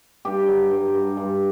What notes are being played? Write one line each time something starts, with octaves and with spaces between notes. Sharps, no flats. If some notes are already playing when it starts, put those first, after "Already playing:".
G2 G4
F#3
G2
G2
G2